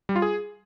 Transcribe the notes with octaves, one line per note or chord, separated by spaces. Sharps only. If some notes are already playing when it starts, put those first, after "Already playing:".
G3
F4
G#4